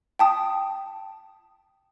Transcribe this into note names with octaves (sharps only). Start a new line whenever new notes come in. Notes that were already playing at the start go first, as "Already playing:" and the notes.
G5 A5 D#6